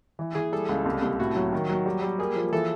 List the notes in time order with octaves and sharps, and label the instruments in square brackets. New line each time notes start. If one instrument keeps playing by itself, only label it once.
[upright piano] E3
[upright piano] E3 [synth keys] G#4
[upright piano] G3 [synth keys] A4
[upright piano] C#2
C2
C2
[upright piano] A2 [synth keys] F#4
[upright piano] F#3
D#3
F#3
G3
G3
[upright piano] A#3 [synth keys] G#4
[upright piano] F3
[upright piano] E3 [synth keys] A4